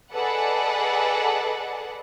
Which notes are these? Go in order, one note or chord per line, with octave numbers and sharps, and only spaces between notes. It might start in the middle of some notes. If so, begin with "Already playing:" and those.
G#4 A4 B4 D5 D#5 F#5